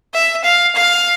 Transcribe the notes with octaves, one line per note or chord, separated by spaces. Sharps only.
E5
F5
F5